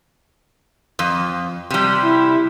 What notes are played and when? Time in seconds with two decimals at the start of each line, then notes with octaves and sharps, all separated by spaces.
0.99 F2
1.70 C3 G3
2.03 E4